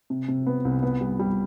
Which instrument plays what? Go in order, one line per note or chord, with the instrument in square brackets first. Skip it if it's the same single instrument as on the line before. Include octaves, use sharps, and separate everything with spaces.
[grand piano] C3
C3
B3
C2
B3
G3
G3